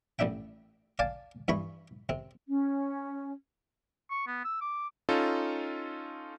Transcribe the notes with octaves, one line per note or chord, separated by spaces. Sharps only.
A1 G3 D4 E5 G5
D5 F5 G#5 A5
G2 E3 B5 C#6
C3 C4
C#4
C#6
B3
E6
D6
C#4 D#4 F4 A4